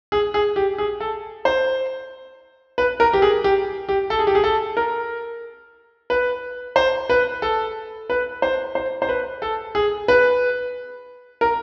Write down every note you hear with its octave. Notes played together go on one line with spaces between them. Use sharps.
G#4
G#4
G4
G#4
A4
C5
B4
A#4
G4
G#4
G4
G4
A4
G#4
G4
G#4
A4
A#4
B4
C5
B4
A4
B4
C5
C5
C5
B4
A4
G#4
B4
A#4